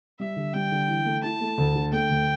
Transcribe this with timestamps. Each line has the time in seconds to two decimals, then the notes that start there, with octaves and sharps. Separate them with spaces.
0.19 G3 E5
0.36 D3
0.54 G3 G5
0.72 D3
0.88 E3
1.05 A3
1.23 E4 A5
1.40 A3
1.58 D2
1.76 D3
1.92 A3 G5
2.09 D2